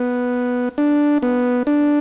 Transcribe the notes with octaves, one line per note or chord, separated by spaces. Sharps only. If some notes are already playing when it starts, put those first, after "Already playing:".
Already playing: B3
D4
B3
D4